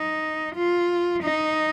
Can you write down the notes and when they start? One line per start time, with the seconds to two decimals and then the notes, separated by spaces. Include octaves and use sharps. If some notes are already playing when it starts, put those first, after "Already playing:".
Already playing: D#4
0.55 F4
1.23 D#4